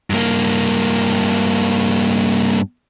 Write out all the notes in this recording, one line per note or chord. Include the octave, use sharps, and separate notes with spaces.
G2 A#3